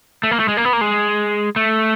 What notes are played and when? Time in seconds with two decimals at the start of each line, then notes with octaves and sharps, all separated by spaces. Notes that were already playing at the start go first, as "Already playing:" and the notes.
0.23 A3
0.31 A#3
0.40 A3
0.48 G#3
0.57 A#3
0.65 B3
0.73 A#3
0.81 G#3
1.56 A3